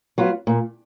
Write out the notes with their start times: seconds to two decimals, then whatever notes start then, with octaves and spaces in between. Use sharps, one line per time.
0.18 F#3 B3 F4
0.47 A#2